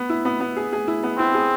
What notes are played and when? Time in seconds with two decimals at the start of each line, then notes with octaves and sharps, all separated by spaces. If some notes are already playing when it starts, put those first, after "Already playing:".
Already playing: B3
0.09 E4
0.25 B3
0.40 B3
0.56 G#4
0.72 G#4
0.88 E4
1.03 B3
1.19 C4 E4
1.34 G#4